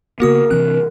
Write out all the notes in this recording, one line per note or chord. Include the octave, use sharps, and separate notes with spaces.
C#3 A#3 B3 F#4 A#4 D#6
C3 E3 C4 F#6